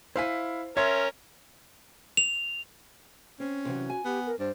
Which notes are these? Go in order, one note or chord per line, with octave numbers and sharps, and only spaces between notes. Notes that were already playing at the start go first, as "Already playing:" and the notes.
E4 C5 F5 G#5 B6
C#4 A#4 C#5 E5 C6 G#6
F7
C4 C#4
C3 E3 F#3
F#4 G#5
B3 G4
A#4
G2 C5